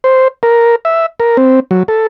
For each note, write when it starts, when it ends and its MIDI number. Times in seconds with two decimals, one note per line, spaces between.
0.04 0.28 72
0.43 0.76 70
0.85 1.06 76
1.20 1.37 70
1.37 1.60 60
1.71 1.83 54
1.88 2.07 69